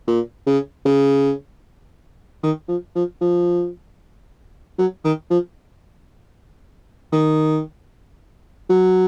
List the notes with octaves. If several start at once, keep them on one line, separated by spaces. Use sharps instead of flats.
A#2
C#3
C#3
D#3
F3
F3
F3
F#3
D#3
F3
D#3
F#3